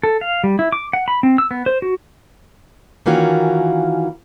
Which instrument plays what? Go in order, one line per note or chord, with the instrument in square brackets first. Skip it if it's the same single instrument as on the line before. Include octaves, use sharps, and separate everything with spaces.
[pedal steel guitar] A4
F5
G3
E4
D6
F#5
B5
C4
E6
B3
C5
F#4
[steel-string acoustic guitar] D#3 E3 A#3 C#4 F4 F#4